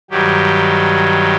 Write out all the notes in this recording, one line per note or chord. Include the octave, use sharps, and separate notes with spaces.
G2 D#3 F#3 G4